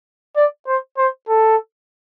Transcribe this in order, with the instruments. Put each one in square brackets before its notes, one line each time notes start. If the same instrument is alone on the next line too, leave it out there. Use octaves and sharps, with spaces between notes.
[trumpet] D5
C5
C5
A4